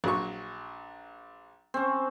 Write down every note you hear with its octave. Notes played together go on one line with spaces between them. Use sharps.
A#1 F#3 C#6
C4 C#4